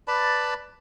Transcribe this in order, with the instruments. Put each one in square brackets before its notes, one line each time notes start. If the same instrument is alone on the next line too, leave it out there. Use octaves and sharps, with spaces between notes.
[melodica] B4 D5 A5 B5